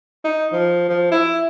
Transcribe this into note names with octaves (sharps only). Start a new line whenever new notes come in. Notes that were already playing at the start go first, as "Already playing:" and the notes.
D#4
F3
F3
E4